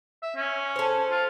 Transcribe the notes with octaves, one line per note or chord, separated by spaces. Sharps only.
E5
C#4
A4 C5
F4